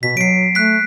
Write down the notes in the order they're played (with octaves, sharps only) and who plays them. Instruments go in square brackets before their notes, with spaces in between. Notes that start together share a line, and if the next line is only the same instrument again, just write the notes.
[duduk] B2 [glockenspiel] B6
[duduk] F#3 [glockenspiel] C7 D7
[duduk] A3 [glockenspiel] F#6 B6